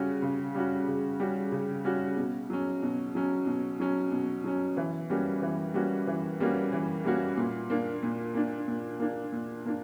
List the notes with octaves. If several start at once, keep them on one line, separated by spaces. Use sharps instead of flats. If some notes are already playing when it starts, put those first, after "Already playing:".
Already playing: C#3 G3 C#4 F#4
C#3
G3 C#4 F#4
C#3
G3 C#4 F#4
C#3
G3 C#4 F#4
B2
F#3 C#4
B2
F#3 C#4
B2
F#3 C#4
B2
F#3 C#4
E3
G3 A#3 C#4 F#4
E3
G3 A#3 C#4 F#4
E3
G3 A#3 C#4 F#4
E3
G3 A#3 C#4 F#4
A#2
A#3 D4
A#2
A#3 D4
A#2
A#3 D4
A#2
A#3 D4